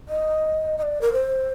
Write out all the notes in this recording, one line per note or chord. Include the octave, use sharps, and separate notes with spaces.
D#5
D#5
D5
A#4
C5